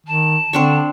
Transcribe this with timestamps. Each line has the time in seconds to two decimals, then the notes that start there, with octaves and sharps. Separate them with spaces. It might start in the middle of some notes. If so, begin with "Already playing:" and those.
0.06 D#3 A5
0.53 D3 C4 D4 C#6